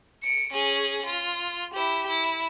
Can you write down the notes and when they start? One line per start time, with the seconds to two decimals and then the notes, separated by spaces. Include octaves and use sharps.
0.23 C#7 D7
0.52 C#4 G#4
1.05 F4
1.74 E4 G4
2.08 E4